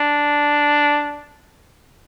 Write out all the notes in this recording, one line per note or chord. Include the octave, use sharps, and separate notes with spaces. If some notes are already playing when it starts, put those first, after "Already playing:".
Already playing: D4